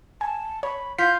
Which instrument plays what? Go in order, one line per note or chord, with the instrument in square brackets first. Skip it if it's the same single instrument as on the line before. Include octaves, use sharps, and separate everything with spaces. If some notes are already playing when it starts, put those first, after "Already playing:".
[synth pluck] G#5 [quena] A5
[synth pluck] C#5 [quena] B5
[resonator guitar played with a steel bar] F4 [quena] G6 [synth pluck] B6